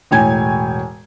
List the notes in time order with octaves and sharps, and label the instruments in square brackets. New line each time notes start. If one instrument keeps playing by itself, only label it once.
[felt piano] E1 A2 C#5 G5 G#5 G#6